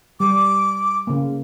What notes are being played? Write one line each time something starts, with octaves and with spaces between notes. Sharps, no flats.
G3 D6
C#3 A#3